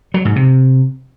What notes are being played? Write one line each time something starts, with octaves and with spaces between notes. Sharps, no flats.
F#3
G#2
C3